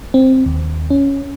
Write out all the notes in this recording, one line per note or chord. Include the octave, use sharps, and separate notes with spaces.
C4
D#2
C#4